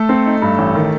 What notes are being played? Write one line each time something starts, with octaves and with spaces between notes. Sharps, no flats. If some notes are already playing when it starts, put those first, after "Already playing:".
Already playing: A3 A4
C4
D#4
G2
A1
D#3